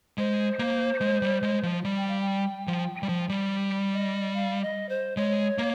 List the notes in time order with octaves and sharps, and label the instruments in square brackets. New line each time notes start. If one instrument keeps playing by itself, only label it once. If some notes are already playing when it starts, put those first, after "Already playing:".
[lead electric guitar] G#3 [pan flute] C5
[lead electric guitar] A#3
G#3
G3
G#3
F3
G3
[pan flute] G5
F5
G5
[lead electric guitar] F3
G3
F3
G3
[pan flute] D#5
F5
D#5
C5
[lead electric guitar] G#3 [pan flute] C#5
[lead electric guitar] A#3